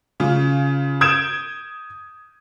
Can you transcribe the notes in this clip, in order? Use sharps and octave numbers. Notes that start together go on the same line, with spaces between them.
C#3 F4
D#6 G6 G#6 D7 E7